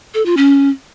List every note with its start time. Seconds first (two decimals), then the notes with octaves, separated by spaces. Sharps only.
0.14 A4
0.26 F4
0.37 C#4